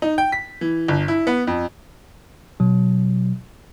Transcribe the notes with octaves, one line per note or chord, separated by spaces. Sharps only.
D#4
G5
B6
E3
G1
E4
B3
F2
B2 F#3